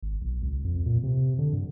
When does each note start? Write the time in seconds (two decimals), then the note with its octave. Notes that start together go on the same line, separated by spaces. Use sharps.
0.03 G#1
0.22 B1
0.42 C#2
0.64 F2
0.86 A#2
1.03 C3
1.39 D3
1.53 G2